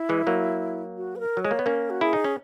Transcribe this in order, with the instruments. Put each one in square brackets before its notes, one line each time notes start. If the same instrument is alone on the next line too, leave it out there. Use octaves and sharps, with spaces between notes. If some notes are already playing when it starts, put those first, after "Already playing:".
Already playing: [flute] E4
[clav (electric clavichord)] E3 G#3
F#3 A#3
[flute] F#4
B4
A#4
[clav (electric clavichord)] F#3
[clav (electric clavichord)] G#3 [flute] C#5
[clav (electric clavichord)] A#3
B3
[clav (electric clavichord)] A#3 C#4 [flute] A#4
[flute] F#4
[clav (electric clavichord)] E4 [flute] G#4
[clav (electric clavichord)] D#4
C#4